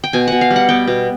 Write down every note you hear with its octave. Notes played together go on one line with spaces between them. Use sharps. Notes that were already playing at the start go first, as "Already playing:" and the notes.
G5
B2 G#5
B2 F#5
F5
G3
F#5
B3 G5
B2